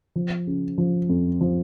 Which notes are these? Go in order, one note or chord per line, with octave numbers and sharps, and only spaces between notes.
F3
C#3
F3
F2
F3